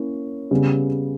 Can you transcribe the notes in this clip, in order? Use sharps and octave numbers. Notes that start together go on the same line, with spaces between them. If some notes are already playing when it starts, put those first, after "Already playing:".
Already playing: A#3 C#4 E4
C#3 G3 B3